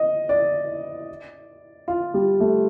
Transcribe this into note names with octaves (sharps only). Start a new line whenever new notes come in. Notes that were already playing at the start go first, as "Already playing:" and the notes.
Already playing: D#5
D5
F4
G3
A3